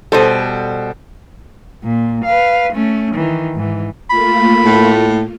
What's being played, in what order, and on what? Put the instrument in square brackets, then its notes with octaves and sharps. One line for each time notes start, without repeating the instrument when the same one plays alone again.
[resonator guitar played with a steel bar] B2 G3 [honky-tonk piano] A4 C5
[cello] A#2
B4 F5
A3 C#4
D#3 E3
G#2 E3
[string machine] A3 A#3 F4 [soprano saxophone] B5
[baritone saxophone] A2